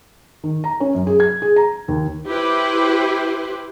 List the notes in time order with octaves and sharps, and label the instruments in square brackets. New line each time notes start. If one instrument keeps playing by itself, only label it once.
[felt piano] D#3
A#5
C#4
F#2
G#4
G#6
G#4
A#5
D#2
[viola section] E4 G4 B4 C5